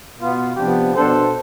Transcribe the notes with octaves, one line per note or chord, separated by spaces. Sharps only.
B2 B3 F4
C3 F3 B3 D4 G4
B2 B3 D4 A4 C5